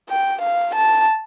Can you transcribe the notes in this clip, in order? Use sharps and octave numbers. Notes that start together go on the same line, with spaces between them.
G5
F5
A5